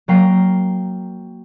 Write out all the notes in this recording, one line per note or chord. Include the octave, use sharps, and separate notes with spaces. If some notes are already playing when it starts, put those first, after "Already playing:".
F#3 A#3 G5 A#5 C7